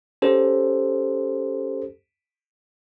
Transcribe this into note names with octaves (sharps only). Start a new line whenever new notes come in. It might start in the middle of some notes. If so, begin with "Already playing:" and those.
C#4 G4 A4 C5